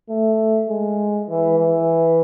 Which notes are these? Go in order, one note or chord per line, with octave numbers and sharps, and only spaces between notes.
A3
G#3
E3
E3